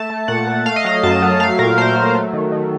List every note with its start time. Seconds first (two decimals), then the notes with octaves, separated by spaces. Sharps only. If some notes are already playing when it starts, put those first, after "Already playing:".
Already playing: A3 A5
0.10 A3
0.28 A#2 F#5
0.47 A3
0.66 A3 F5
0.76 D#5
0.85 F#3 F5
1.03 F#2 A5
1.22 F#3
1.40 A3 F5
1.59 A#2 A#4
1.78 A3 C5
1.96 F#3
2.15 A3
2.33 D#3
2.52 D#3